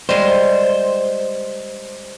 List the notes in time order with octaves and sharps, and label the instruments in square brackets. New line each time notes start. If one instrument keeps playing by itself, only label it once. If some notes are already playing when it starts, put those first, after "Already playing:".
[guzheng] G3 G#3 [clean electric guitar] C5